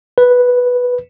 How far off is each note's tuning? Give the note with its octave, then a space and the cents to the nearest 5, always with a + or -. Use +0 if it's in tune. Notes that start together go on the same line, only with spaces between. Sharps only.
B4 -5